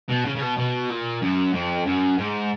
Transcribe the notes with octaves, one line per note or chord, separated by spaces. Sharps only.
B2
C#3
C#3
B2
B2
A#2
F#2
F2
F#2
G#2